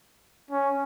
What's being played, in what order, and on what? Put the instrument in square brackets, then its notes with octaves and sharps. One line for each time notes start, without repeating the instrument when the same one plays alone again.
[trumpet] C#4